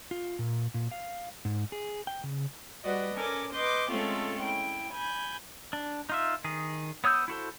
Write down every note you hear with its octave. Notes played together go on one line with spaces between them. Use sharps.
F4
A#2
A#2
F5
G#2
G#4
G5
C#3
G3 F#4 B4 D5 D#5
C#4 A4 A#4 G#5 D6
B4 D#5 C6 D6 G6
G#3 A3 C4 C#4 F4 A4
E4 G5
G#5 B5 G6
D4
D#4 F4 E5
D#3 G#4
B3 C#5 D#6 E6 G6
E4 F#4 A4 C5